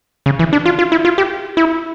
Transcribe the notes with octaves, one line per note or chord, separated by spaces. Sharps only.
C#3
E3
D4
F4
F4
E4
F4
G4
E4